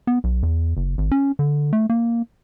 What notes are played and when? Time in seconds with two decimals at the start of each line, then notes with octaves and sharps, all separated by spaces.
0.07 B3
0.24 B1
0.43 E2
0.77 F#1
0.98 G#1
1.12 C#4
1.39 D3
1.73 A3
1.90 A#3